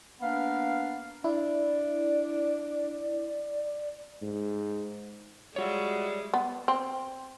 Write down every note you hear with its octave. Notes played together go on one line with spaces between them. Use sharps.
A#3 B3 D4 B4 F5
D4 E4 D5
G#2
G3 G#3 F4 F#4 C#5 E5
B3
C4